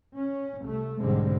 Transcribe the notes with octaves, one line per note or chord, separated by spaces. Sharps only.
C#4
C2 A3
B1 G#2 D3 G3 G#3 C4